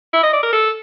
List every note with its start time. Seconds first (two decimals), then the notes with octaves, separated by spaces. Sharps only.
0.14 E4
0.23 D#5
0.33 D5
0.43 A#4
0.53 A4